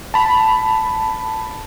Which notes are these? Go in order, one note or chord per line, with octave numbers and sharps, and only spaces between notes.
A5 B5